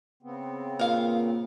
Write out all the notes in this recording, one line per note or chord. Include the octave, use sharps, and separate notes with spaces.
C#3 B3 C4
A#2 A#3 A#4 F5